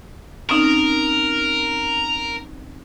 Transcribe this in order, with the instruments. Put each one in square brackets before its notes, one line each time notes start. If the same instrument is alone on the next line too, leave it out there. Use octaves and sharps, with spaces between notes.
[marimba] C4 C#4 D#4 [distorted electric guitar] A#4